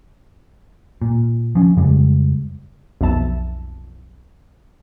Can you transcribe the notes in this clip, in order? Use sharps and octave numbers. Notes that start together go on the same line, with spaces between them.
A#2
F3 C#4
F2 C#3 G3 G#3
B1 F2 E5 A5